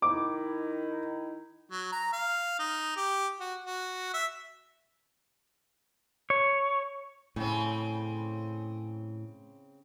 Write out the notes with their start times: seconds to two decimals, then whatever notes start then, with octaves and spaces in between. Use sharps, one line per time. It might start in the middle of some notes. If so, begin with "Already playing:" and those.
0.02 D#3 D#4 E4 D6
1.71 F#3
1.92 A#5
2.13 F5
2.59 D#4
2.97 G4
3.40 F#4
3.64 F#4
4.14 E5
6.30 C#5
7.36 A2 C#3 C4